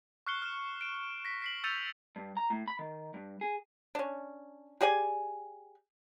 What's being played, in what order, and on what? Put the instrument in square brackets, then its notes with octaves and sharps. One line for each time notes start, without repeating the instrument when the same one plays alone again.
[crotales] C#6 F6 F#6 C7 C#7 G7
F6 F#6 E7
D7 E7
A#6 B6
B6 C7 F#7
E6 G6 A6 C#7 D#7 F7
[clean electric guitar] G2
A#5
A2
B5
D#3
G2
G#4
[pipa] C#4 D4
G4 G#4 D5 G#5